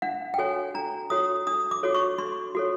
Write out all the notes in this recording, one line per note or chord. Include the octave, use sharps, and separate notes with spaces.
D4 F#5
G5
F#4 A4 C#5 G#5
D4 A#5
F#4 A4 C#5 D#6
D4 D#6
D6
F#4 A4 C#5
C#6
D4 C6
F#4 A4 C#5